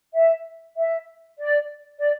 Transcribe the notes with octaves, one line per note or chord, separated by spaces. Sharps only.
E5
E5
D5
D5